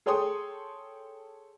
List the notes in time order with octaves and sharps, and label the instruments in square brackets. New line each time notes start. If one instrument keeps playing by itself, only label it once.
[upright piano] G#4 A4 C#5 G5 C6 D#6